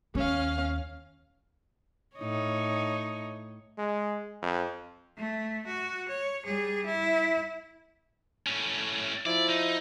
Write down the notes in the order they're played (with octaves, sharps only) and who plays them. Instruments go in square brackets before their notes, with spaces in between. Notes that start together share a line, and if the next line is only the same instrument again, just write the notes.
[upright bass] D#2 [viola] C#4 F5
[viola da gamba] A2 D#4 C#5
[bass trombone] G#3
F2
[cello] A3
F#4
C#5
G3 G#4
E4
[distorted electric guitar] A2 C#4
[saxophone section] F3 E4 [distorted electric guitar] D5
[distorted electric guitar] D#4